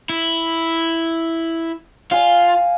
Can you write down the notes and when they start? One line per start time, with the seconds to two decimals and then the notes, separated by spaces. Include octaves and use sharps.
0.10 E4
2.11 F4 F5 G#5